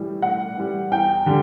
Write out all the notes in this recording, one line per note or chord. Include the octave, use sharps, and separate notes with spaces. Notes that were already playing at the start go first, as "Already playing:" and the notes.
Already playing: A2 E3 G3
A2 F#5
E3 G3
E2 G5
D3 G3